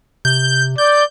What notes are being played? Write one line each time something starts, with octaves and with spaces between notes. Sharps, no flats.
C3 G6
D5 G6